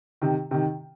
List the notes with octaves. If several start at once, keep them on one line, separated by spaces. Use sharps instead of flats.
C3 D#3
C3 D#3